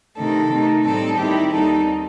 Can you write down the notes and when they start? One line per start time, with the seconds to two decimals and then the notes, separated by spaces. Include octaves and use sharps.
0.17 C3 D#3 A3 A4
0.51 C3 D#3 A3 D#4
0.85 A2 G3 C4 D#4 A4
1.19 D#3 G3 C4 E4 G4
1.52 D#2 D#3 G3 C4 D#4 A4